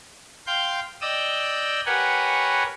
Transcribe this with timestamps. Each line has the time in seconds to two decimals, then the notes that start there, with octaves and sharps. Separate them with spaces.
0.47 F5 G5 C6 G6
1.01 D5 D#5 G5 D#6 E6
1.86 G4 A#4 B4 C#5 F#5 G#5